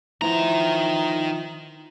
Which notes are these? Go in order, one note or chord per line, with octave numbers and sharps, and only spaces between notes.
D#3 F3 B3 E4 A#5